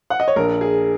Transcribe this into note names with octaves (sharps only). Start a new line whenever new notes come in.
F#5
D#5
C#5
A#1 A#4
G#4